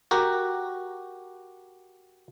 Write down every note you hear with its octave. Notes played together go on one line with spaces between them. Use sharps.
F#4 G4 A#4